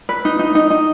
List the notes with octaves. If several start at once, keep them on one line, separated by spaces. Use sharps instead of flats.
B4
D#4
D#4
D#4
D#4